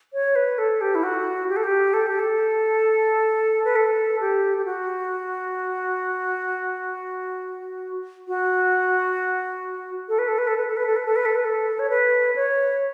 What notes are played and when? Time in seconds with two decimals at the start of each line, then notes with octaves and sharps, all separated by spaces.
0.13 C#5
0.36 B4
0.58 A4
0.81 G4
0.95 E4
1.03 F#4
1.49 G4
1.56 A4
1.64 G4
1.94 A4
2.07 G4
2.19 A4
3.64 B4
3.76 A4
4.20 G4
4.58 G4
4.65 F#4
8.28 F#4
10.09 A4
10.19 B4
10.28 A4
10.38 B4
10.48 A4
10.57 B4
10.67 A4
10.77 B4
10.86 A4
10.96 B4
11.06 A4
11.16 B4
11.25 A4
11.35 B4
11.45 A4
11.79 C#5
11.90 B4
12.36 C#5